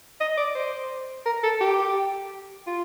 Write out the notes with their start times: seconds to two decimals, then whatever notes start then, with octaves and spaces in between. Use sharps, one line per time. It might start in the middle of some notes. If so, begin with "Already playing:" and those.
0.20 D#5
0.38 D5
0.55 C5
1.26 A#4
1.44 A4
1.61 G4
2.67 F4